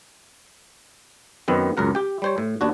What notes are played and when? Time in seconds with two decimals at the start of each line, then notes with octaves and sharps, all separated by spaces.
1.48 F#2 D#3 B3 C4
1.77 C#2 F#2 A#4 F#5
1.95 G4 G5
2.22 G3 C5 C#5
2.38 A2
2.61 D#2 D4 F#4